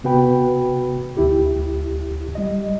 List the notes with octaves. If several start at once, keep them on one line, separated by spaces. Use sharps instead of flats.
C3 B3 F#4 B4 G5 B5
D2 E4 G4
G3 D#5